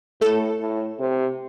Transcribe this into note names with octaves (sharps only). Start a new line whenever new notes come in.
A2 A3 A4
A2
C3